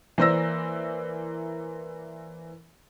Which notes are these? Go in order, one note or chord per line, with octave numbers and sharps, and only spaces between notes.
E3 A#3 C5 D5 E6 A#6